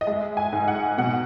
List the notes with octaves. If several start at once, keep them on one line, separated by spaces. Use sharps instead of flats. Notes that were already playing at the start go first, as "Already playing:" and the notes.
D#5
G#3 E5
G#5
G#2
F#5
B2 F#5